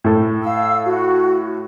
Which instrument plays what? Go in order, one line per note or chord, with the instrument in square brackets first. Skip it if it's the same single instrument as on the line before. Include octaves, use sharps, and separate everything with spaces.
[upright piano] A2 A4
[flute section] F5 E6
F#4